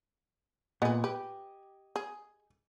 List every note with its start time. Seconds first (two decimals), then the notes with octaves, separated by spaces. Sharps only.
0.82 A#2 B3 B4 D#5 G#5
1.04 G4 B4
1.96 G#4